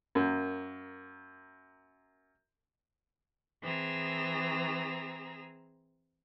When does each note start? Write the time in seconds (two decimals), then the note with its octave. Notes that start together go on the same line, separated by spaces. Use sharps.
0.15 F#2 A#3
3.62 E3 C4 G#4 A#5 E6 A#6